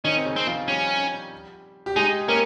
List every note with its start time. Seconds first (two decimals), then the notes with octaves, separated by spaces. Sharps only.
0.04 D#3 C#4 D#4
0.17 C4
0.25 C#3 C#4
0.36 C4
0.47 F3 F4
0.68 G3 C#4 G4
1.86 G4
1.96 G#3 D#4 G#4
2.28 A#3 C#4 A#4